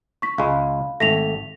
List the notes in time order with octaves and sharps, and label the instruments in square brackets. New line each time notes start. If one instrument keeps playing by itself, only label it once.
[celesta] C#6 B6
[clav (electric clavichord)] C#2 G#3 [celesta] F5 B5
[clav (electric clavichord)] G#1 A3 [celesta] A#6 B6 F7